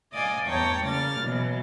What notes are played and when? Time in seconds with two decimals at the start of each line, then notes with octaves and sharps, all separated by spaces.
0.12 D5 D#5 F5 G#5
0.46 E2 C#5 G5 A5 A#5
0.85 C#3 A#3 D5 F6 A6
1.21 B2 E3 F#3